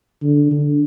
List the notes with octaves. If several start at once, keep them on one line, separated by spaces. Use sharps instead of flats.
D3
D3